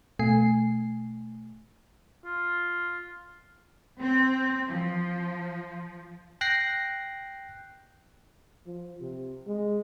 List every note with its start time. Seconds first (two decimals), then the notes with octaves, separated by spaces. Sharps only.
0.19 B2 A3 G#5 C7
2.25 F4
4.01 C4
4.68 F3
6.41 G5 F#6 A#6 C7
8.66 F3
9.01 C3
9.47 G#3